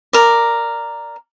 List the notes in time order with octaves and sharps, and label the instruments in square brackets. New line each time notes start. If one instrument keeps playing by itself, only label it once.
[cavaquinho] A#4 D5